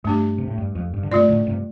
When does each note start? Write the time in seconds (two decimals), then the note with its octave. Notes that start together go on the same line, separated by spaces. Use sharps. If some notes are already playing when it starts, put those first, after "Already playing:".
0.05 G2 A3 D4 G4
0.38 C3
0.48 A2
0.58 G2
0.75 F2
0.94 G2
1.03 D3
1.11 G2 C3 A3 F4 D5
1.29 A2 D3
1.47 G2 C3